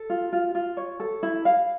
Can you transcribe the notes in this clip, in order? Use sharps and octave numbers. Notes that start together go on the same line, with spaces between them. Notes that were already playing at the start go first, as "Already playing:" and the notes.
Already playing: A4
F4
F4
F4
C#5
A4
E4
F5